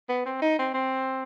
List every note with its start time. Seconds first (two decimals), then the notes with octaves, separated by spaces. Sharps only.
0.09 B3
0.26 C4
0.42 D#4
0.59 C4
0.74 C4